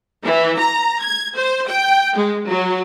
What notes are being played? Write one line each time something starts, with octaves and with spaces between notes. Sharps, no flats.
E3
A#5
G#6
C5
G5
G#3
F#3